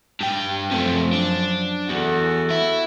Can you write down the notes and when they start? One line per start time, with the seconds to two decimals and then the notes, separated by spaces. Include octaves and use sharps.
0.20 G2 G5
0.71 F#2 C3 F3 A3
1.13 D4
1.89 E2 F#4 A4
2.51 E4